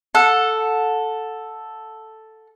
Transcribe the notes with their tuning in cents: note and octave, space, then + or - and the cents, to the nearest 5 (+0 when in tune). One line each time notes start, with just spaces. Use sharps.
A4 +0 F#5 -25